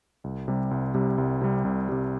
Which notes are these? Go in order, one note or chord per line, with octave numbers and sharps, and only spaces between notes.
C2
C3 G3
C2
C3 G3
C2
C3 G3
C2
C3 G3